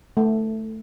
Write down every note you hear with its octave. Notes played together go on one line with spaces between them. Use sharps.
A3